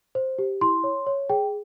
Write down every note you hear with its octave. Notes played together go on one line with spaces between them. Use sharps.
C5
G4
E4 C6
C#5
C#5
G#4 G5